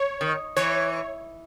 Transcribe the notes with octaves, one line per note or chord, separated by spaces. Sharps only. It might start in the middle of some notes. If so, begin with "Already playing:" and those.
Already playing: C#5
D#3
E3 C#5